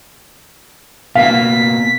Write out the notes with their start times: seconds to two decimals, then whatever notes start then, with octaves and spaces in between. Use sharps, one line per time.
1.15 B2 A#3 F5 B6